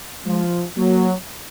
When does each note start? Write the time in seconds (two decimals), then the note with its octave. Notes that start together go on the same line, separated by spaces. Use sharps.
0.25 F3 G#3
0.77 F#3 A#3